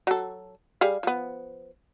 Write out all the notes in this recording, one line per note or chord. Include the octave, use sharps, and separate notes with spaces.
F#3 A4
G3 G#4 F5
F3 B3